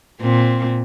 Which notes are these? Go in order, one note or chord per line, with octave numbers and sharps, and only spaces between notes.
A#2 C4